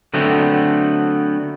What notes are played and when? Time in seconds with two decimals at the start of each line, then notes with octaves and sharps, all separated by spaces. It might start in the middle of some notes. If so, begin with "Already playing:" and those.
0.14 D3 F#3 A3 B3 C4